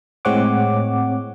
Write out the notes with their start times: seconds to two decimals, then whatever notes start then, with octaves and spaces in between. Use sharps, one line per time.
0.25 A2 G#3 C4 C#5 F#5 D6